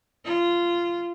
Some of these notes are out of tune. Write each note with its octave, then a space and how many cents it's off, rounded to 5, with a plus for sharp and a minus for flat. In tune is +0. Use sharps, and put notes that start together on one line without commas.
F4 -15